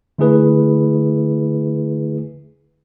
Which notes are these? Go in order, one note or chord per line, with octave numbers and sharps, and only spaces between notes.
D3 A3 E4 G#4 B4